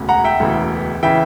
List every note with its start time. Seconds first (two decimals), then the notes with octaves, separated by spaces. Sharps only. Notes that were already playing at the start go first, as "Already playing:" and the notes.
Already playing: E1 D2 C#3
0.09 F#5 A#5
0.24 E5 G5
0.40 E1 D2 C#3 E3
1.03 C#3 E3 E5 G5